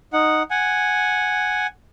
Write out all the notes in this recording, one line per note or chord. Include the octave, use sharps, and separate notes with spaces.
D#4 F#5
F#5 G#5